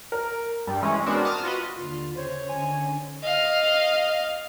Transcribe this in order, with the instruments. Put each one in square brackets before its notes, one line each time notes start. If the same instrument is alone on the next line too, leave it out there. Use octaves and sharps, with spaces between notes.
[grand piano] A#4
[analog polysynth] G2 G3
E3 G#3 C#4
B3 C4 D4 F#4 A#4
A5 D#6 F6
F4 F#4 B4 D#5
[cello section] D#2 D3 [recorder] F4
[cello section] C#3 [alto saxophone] C5 [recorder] C#5
[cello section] D3 D#3 C#4 [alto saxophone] G#5
[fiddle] D#5 F5